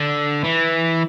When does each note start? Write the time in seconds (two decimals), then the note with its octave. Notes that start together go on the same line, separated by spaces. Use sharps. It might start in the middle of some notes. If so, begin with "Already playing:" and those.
Already playing: D3
0.44 E3